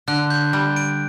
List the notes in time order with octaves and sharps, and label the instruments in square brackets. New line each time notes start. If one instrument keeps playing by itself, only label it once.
[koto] D3 [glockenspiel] F#6
[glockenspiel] G6
[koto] G3
[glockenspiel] D7